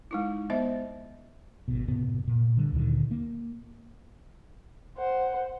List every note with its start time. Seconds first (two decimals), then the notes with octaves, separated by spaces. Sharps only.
0.11 G#3 D#4 E4
0.50 B3 C5 D#5 E5
1.68 G#1 B2
1.88 F#1 A2 C3 B3
2.28 A#2
2.57 D3 G3
2.72 D2 A#2 D3 D#3
3.11 A#3
4.98 C5 F#5